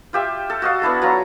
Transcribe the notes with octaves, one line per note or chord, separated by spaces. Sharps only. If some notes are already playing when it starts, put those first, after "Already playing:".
F4 G4 E5
A4
F#4 D#5 F5
B3 D4 E4 A4
F#3 F4 C#5 A#5